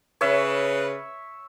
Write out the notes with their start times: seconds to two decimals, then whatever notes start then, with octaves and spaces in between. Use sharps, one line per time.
0.21 C#3 C#4 B4 C#5 E5